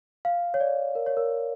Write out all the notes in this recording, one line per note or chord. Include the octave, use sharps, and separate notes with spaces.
F5
C#5
D5
A#4
C#5
A#4